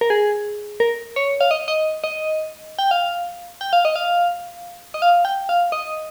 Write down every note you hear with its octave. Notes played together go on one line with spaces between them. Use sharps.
A#4
G#4
A#4
C#5
F5
D#5
D#5
D#5
G5
F5
G5
F5
D#5
F5
D#5
F5
G5
F5
D#5